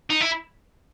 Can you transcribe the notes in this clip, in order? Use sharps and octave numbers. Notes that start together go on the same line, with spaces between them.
D#4
E4